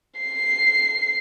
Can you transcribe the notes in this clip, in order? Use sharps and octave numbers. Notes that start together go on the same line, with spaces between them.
C7